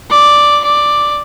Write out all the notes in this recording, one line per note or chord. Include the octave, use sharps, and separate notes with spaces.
D5
D5